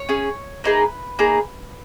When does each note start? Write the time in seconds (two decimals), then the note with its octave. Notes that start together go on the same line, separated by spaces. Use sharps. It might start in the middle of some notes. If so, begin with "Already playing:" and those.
Already playing: C#5
0.09 C#4 G#4
0.64 A#3 D#4 G#4 B4
1.19 A#3 D#4 G#4